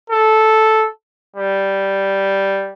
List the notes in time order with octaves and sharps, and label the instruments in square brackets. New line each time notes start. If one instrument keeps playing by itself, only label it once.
[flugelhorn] A4
G3